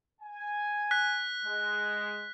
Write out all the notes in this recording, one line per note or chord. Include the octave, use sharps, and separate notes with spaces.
G#5
F#6 B6
G#3